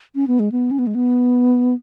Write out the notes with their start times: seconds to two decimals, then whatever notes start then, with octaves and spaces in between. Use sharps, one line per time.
0.15 C#4
0.27 B3
0.40 G#3
0.52 B3
0.71 C#4
0.79 B3
0.87 G#3
0.95 B3